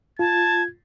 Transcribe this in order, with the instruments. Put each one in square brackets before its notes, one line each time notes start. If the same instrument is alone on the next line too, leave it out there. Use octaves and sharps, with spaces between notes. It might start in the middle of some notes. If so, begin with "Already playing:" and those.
[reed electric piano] F4 [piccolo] A5 [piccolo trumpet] G#6